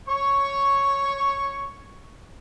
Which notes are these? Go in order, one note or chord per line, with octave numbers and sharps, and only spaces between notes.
C#5 C#6